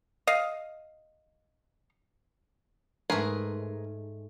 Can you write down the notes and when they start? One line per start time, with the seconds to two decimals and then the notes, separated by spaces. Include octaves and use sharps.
0.27 D#5 F5
3.10 G#2 A3 G#4 A#4 B4